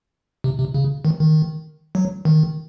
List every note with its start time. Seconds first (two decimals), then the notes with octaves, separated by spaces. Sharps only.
0.44 C3
0.59 C3
0.74 C#3
1.05 D#3
1.20 D#3
1.95 F#3
2.25 D#3